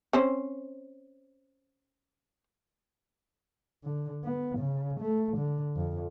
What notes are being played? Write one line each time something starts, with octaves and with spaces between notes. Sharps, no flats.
C4 C#4 C5
D3
B3
C#3
A3
D3
F2